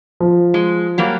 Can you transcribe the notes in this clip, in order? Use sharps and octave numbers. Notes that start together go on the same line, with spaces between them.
F3
G#3
F#3 G3 A#3